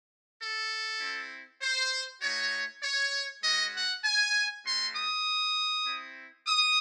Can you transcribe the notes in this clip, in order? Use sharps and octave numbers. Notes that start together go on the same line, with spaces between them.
A4
C4 E4
C5
A3 D#4 F#4 C#5
C#5
G#3 C#4 F#4 D#5
F#5
G#5
A3 C#4 F#4 C6
D#6
C4 E4
D#6